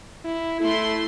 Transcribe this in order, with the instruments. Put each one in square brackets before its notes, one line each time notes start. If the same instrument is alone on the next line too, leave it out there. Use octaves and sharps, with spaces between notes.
[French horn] E4
[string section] A3 C6 [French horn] E4